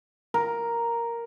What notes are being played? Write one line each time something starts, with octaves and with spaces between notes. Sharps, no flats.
A#4